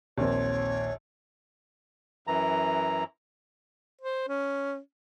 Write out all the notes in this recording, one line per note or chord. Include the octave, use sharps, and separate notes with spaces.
A#1 D#2 C4 A#4 C#5
F#2 E3 A#5
C5
C#4